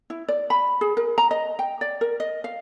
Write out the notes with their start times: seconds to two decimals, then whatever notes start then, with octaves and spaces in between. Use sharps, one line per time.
0.10 E4
0.29 D5
0.50 B5
0.81 G#4
0.97 A#4
1.18 A#5
1.31 D#5
1.59 G5
1.81 D5
2.01 A#4
2.20 D#5
2.44 F5